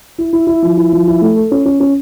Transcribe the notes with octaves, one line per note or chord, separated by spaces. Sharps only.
E4
E4
E4
F3
E4
F3
E4
A3
A4
C#4
C#4
C#4